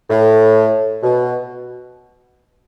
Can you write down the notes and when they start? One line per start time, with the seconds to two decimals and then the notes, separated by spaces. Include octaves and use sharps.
0.10 A2
1.03 B2